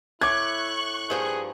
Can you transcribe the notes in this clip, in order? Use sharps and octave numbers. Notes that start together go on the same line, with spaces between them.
A2 E4 C#6 D6 F#6 G#6
G2 F3 A#3 G#4